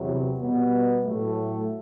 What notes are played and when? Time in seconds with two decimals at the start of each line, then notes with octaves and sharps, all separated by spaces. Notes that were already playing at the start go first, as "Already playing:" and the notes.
Already playing: E2 C3 F#3
0.39 B2 G3 B3
1.04 A2 F#3 A3